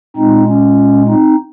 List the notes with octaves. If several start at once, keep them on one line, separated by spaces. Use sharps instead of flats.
A#2 G#3 C4 D#4
C#4
C4 D#4